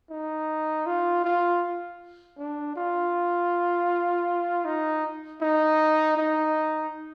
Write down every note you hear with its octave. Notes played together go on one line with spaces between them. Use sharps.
D#4
F4
F4
D4
F4
D#4
D#4
D#4